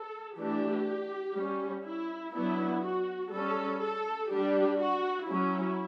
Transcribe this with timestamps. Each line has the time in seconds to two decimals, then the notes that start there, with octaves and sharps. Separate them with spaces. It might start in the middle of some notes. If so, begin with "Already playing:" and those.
Already playing: A4
0.36 E3 A3 D4 G4
1.34 G3 C#4
1.83 E4
2.32 F#3 B3 D4 E4
2.82 F#4
3.30 G3 C#4 A4
3.80 A4
4.29 G3 D4 G4
4.78 F#4
5.27 F#3 C#4 E4